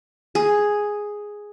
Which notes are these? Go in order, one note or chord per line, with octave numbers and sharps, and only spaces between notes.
G#4